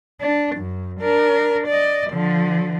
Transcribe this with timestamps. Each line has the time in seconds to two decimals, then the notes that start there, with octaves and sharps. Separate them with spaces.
0.21 D4
0.56 F#2
1.00 D4 A#4
1.68 D5 D#5
2.10 D3 F3